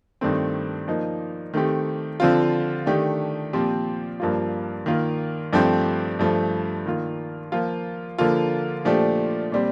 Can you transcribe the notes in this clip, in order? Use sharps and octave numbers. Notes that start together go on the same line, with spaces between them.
G2 D#3 A3 C4
F3 A#3 D#4
D#3 A3 C4 G4
D3 F3 C4 F4
D#3 A3 D4 G4
A#2 F3 C4 G4
G2 F3 A#3 F4
D#3 A#3 F4
G2 F3 A3 C4 G4
G2 F3 A3
D#3 A#3 F4
F3 A#3 F4
D3 F3 A#3 F4
A#2 F3 A3 D4 G4
A#2 G3 C4